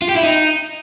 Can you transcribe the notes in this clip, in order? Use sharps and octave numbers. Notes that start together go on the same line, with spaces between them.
F4
G4
E4
D#4